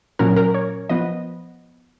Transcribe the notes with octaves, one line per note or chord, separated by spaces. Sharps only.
A#2 F#3 C#4 A#4
A#4
C#5
F3 B3 D#5